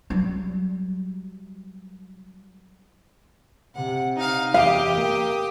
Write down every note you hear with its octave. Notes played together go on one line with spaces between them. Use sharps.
F#3 G3
C3 F#5
D#4 F5
E2 G4 F5 D#6
A#3